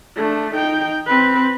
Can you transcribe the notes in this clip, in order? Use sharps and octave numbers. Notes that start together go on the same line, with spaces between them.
A3 D4
D#4 G5
C4 B4